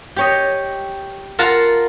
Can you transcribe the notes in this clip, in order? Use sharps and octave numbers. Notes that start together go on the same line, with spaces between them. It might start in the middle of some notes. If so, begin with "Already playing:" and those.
G4 C#5 D#5
F4 A#4 F#5 A5 A#5